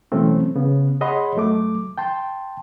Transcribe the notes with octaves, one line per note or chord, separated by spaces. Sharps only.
B2 E3 F#3 A3 C4 C#4
C#3 B3
G#4 C#5 D#5 F#5 B5 C6
G2 F#3 A3 D6
G5 A5 C6